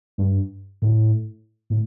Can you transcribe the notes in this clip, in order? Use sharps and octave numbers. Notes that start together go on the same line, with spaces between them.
G2
A2
A2